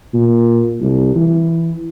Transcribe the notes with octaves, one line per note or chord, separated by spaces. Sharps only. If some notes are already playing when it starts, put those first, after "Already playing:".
A#2
C2
E3